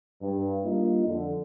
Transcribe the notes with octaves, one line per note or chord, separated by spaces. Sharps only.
G2
G3 A#3 D4 D#4 F4
F2 D3